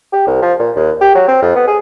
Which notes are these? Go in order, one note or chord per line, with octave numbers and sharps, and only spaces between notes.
G4
C2
F3
A#2
D#2
G4
F#3
C4
F2
B3
G#4